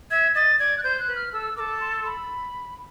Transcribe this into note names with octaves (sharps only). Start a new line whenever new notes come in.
E5 G#6
D#5 A6
D5 G#6
F#6
C5 G6
F#6
B4
F6
A4 E6
A4 A#4 D6
C6
B5